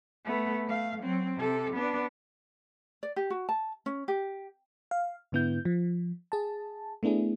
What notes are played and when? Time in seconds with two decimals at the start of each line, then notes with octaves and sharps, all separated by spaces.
0.25 A3 B3
0.68 A3 F5
1.02 F#3 C4
1.38 C3 A4
1.74 B3 D4
3.03 D5
3.16 G4
3.30 F#4
3.49 A5
3.86 C#4
4.08 G4
4.91 F5
5.32 G#2 D3 B3 E4 G6
5.65 F3
6.32 G#4 A5
7.03 A3 B3 D4 E4 G#4